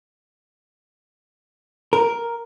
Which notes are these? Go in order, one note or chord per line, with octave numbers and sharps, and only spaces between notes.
A#4